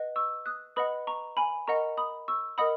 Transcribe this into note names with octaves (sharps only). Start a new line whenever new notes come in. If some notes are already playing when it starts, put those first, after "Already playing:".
Already playing: B4 D#5 F#5
C#6 E6
D#6 F#6
B4 D#5 F#5 B5 D#6
A#5 C#6
G#5 B5
A#4 D#5 F#5 A#5 C#6
B5 D#6
C#6 E6
A#4 D#5 F#5 B5 D#6